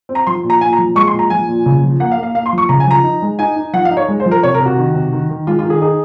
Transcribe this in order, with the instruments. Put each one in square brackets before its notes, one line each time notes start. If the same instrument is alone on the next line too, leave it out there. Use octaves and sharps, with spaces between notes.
[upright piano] C4
A#5
F3 C6
A#2
A#5
A#2 G#5
A#5
F3
G#3 C#6
C6
A#2
A#5
F3 G#5
A#2
C#3
F3
A#3 F#5
F5
A#3
F5
A#3 F5
C6
F3
C#6
C#3 A#5
G#5
F3 A#5
D#4
G#3
D#4 G#5
D#4
F3 F#5
F5
D#4
C#5
G#3
C5
F3
A#4
C3 C#5
A#4
C3
F#4
D#3
C3
D#3
D#3
G#3 F4
F4
D#3
G#4
D#4 G#4